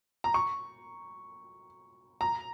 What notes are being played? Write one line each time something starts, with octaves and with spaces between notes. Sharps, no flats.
A#5
C#6
A#5